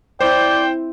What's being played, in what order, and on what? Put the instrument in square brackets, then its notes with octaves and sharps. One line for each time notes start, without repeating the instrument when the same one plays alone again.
[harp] C4 E4 [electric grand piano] C5 [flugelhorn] D5 [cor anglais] G5